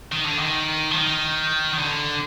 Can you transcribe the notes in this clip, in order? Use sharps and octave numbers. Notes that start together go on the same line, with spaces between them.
D#3
D3
D#3
F3
D#3
D#3
D3